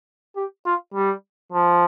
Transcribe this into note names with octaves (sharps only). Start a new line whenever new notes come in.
G4
F4
G3
F3